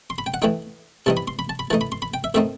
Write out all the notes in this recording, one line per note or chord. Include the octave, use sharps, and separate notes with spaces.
C6
B5
G5
F#5
E3 A3 D#4 G5
C3 E3 G3 D#4 A5
B5
C6
B5
A5
B5
E3 A3 D#4 A5
B5
C6
B5
G5
E5
D#3 A3 C4 D#4 E5